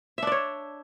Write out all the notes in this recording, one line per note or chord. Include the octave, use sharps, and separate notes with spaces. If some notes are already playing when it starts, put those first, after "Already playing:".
D4 C#5 D5 E5